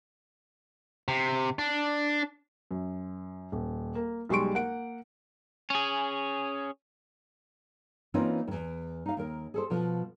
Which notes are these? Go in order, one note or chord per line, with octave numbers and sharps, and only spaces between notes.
C3
D4
F#2
D#1
A#3
B1 G3 G#3 C6 C#6 D7
A#3 F#5 D7
C#4 G#4
E3 A#3 C4 C#4 D#4 F4
E2 G2
D#4 F5
D#2 A#4
G#4 A4 C5
B2 F3 F4